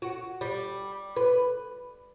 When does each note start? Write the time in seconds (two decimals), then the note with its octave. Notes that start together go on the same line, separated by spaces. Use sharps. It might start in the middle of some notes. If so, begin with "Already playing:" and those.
0.02 F#4
0.41 G3
1.16 B4